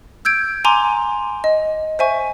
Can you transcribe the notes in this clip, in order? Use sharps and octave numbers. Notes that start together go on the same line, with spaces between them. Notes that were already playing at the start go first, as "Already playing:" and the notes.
E6 G6 G#6 D7
G#5 A#5 C6 D6
D#5
C5 E5 G#5 C#6